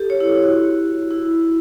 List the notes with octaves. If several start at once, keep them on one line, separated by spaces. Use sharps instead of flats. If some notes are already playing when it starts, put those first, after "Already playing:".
Already playing: G4 A4
C#5
E4
E4
F#4
E4